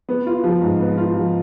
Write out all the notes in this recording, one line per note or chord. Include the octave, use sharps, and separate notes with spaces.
B3
F4
F3
G#2
B3
F4
F3